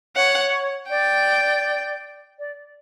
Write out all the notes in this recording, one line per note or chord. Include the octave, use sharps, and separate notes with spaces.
C#5 F#5
D5 G5
D5